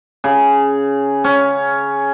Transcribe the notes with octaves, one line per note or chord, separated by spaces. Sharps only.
C#3
C#4